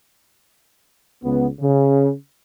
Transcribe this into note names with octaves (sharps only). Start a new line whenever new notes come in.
C#2 B3
C#3